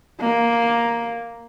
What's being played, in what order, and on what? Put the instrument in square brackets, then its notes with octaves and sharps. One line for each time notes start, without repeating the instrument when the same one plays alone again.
[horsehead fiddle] A#3